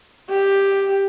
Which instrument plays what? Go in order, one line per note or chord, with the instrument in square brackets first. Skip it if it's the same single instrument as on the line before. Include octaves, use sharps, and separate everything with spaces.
[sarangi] G4